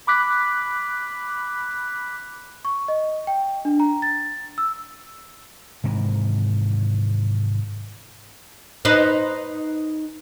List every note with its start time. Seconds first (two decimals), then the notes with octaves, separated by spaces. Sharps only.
0.07 B5 D6 F#6 B6
2.65 C#6
2.88 D#5
3.27 G5
3.65 D4
3.80 A#5
4.02 A6
4.58 E6
5.84 G#2 C3 D#3 E3
8.85 D#4 B4 C5